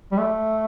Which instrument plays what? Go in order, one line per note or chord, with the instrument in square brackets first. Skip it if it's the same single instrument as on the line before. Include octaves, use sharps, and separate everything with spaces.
[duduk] G3
A3